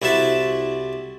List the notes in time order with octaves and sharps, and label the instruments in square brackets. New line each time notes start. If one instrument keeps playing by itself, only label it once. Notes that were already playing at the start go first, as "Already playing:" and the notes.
[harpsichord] C2 E4 F#4 A4 E5 A5